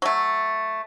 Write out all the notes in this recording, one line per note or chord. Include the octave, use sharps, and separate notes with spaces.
F#3 A3